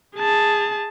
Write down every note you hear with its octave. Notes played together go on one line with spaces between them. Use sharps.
G#4 A5